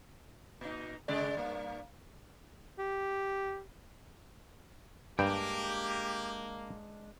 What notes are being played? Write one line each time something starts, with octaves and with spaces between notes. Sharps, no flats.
A#2 D#4
C#3 G#3 D5
G2 A#3
G4
G2 G#3 A#3 D4 G4 G5